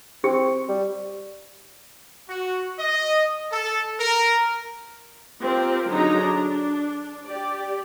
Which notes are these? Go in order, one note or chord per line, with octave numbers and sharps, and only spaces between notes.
C4 G4
G3
F#4
D#5
A4
A#4
C4 F4 G4 A#4
D3 F#3 D#4 G#4 A#5
D4
G4 D5